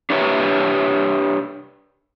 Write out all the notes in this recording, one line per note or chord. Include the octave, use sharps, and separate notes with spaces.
D4 G4 B4 C#5 E5